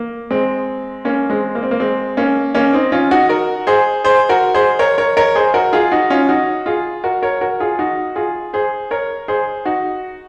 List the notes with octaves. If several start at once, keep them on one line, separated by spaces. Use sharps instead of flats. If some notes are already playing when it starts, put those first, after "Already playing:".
Already playing: A#3
G#3 C4
A#3 C#4
G#3 C4
A#3
C4
A#3
G#3 C4
A#3 C#4
A#3 C#4
C4 D#4
C#4 F4
D#4 F#4
F#4 A#4
G#4 C5
G#4 C5
F#4 A#4
G#4 C5
A#4 C#5
A#4 C#5
A#4 C#5
G#4 C5
F#4 A#4
F4 G#4
D#4 F#4
C#4 F4
D#4 F#4
F4 G#4
F#4 A#4
A#4 C#5
F#4 A#4
F4 G#4
D#4 F#4
F4 G#4
G#4 C5
A#4 C#5
G#4 C5
D#4 F#4